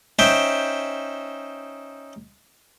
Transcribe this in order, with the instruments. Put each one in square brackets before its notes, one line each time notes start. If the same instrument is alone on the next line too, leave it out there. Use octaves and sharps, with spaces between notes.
[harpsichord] C#4 D#4 C5 E5 G5